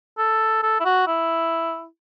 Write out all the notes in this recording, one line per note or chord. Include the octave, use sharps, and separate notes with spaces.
A4
A4
E4
F#4
E4